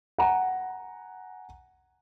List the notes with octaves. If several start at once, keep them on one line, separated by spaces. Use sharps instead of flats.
F#5 G#5 A#5